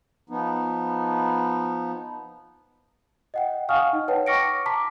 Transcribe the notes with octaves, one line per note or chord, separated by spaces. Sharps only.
F3 B3 D#4
D#5 F#5 G5
F5 F#5 G#5 C#6 D#6 F6
D#4 D#5
B4 C#5 F#5 G5 A5
C#6 D6 F6 A#6 C#7 D7
A5 A#5 C6 D6 B6